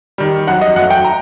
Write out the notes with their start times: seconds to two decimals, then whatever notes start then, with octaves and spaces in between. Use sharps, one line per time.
0.18 D#3 G3
0.48 F#2 F#5
0.61 D#5
0.76 F#3 A3 F#5
0.91 G5
1.04 A#5